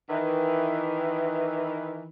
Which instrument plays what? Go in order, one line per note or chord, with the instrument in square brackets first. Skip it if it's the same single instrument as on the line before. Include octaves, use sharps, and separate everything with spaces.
[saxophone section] D#3 E3